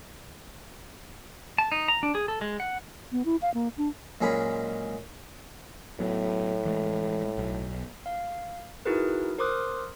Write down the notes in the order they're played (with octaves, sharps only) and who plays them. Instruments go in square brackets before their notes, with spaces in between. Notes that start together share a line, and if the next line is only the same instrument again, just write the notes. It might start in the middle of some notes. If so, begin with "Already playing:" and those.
[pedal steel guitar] A5
D#4
A#5
D4
G#4
A4
G#3
F#5
[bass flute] B3
E4
F5
A#3
D4
[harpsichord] A#2 F#3 G#3 C#4 G#4 B5
[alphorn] A2 [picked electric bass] F#3 B3
[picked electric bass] E3 G#3 A3
B1
[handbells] F5
D#4 E4 F#4 G#4 A#4 B4
A#4 C5 C6 D6 D#6 F#6